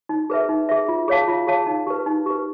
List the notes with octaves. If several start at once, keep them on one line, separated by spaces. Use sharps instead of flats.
D#4
G#4 B4 E5
D#4
G#4 B4 E5
F4
G#4 C#5 F5 A5
F4
G#4 C#5 F5 A5
D#4
G4 B4
D#4
G4 B4